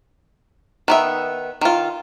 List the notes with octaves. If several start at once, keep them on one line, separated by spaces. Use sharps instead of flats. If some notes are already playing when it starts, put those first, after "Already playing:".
D#3 B3 E5
D#3 F4